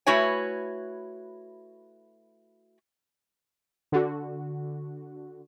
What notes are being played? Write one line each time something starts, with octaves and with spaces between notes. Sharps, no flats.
A3 E4 F#4 B4 C#5 G#5
D3 F#4